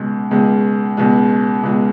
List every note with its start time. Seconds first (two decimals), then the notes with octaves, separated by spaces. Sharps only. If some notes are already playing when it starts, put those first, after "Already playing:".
Already playing: C#2 B2 G#3
0.31 C#2 B2 G#3
0.97 C#2 B2 G#3
1.63 C#2 B2 G#3